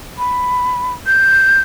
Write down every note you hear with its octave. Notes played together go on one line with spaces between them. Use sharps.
B5
G6